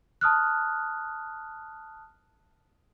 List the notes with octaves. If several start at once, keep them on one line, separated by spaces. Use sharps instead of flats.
A5 D#6 F6 F#6